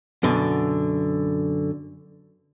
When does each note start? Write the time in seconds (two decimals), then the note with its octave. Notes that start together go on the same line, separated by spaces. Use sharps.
0.23 F#2 B2 D3